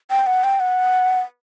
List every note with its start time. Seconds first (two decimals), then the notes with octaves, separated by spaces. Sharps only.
0.11 G5
0.26 F#5
0.44 G5
0.60 F#5